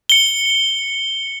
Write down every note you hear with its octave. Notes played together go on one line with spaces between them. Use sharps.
C#7 G7